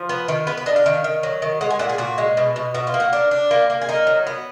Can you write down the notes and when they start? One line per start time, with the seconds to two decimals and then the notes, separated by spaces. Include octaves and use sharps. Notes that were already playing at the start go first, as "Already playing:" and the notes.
Already playing: F3
0.09 B3
0.28 D#3
0.47 B3 B4
0.57 B4
0.66 D4 D#5
0.76 F5
0.86 D#3
1.04 D#3
1.23 F#3
1.42 D#3
1.61 G#3 F#5
1.70 G#5
1.79 A#2 F#5
1.89 G#4
1.98 A#2 F#4
2.18 G#3
2.37 B2
2.56 B2
2.74 B2 F#4
2.87 F4
2.94 A#3
3.00 F#4
3.13 D4 A#4
3.31 D4
3.51 A#3
3.70 A#3
3.81 G#4
3.89 D#4 A#4
4.07 F#3
4.27 B3